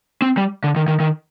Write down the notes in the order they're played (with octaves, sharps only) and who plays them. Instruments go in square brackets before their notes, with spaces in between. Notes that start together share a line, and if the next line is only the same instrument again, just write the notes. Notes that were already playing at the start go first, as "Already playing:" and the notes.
[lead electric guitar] C4
G3
D3
D#3
D#3
D#3